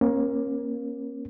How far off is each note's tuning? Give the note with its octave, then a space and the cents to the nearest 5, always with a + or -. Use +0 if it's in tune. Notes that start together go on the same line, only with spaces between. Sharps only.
A#3 +20 C#4 -30